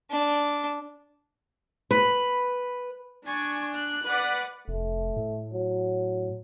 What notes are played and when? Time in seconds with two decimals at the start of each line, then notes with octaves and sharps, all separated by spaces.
0.11 D4
1.91 B4
3.27 D4 G#5 C#6
3.75 F#6
4.05 B4 D5 F#5
4.68 F1 A3
5.16 A2
5.53 F#3